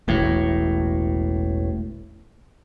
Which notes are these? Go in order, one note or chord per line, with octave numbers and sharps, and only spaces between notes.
E1 A1 A2